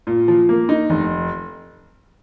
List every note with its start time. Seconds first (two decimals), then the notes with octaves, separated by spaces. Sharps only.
0.07 A#2
0.28 F3
0.49 A#3
0.69 D#4
0.90 F1